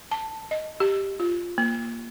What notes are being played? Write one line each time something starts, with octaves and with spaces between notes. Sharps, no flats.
A5
D#5
G4
F4
A#3